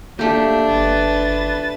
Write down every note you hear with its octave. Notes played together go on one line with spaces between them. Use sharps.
A3 A#3 D4 G4
G1 B4 A6